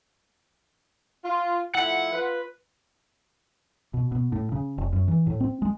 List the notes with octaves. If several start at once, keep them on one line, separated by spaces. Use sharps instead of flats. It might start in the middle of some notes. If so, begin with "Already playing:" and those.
F4
F3 A3 E4 F#5
F4 B4
B2
B2
A2
C#3
F1
F#2
E3
A2
C4
G#3